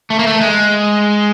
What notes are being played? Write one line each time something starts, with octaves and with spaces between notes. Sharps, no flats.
A3
A#3
A3
G#3